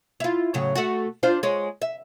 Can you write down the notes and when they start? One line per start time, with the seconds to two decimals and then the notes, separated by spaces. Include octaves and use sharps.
0.20 E4 F4
0.54 A2 C#3 F#3
0.76 A3 F#4
1.23 D4 F4 C5
1.43 G#3 C#5
1.82 E5